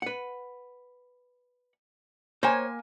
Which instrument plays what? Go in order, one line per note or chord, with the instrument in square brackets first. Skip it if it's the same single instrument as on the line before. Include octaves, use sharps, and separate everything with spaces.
[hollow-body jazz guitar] B4 F#5
[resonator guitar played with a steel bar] A#3 G#5 [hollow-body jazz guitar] C5 C#5